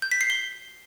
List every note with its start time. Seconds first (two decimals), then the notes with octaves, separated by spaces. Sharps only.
0.02 G6
0.11 B6
0.21 C7
0.30 G7